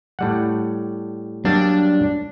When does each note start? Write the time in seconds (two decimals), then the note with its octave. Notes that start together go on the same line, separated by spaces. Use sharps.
0.19 A2 G3 F#5
1.45 F#3 G3 A#3 D4